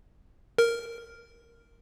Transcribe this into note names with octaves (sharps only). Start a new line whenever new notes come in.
A#4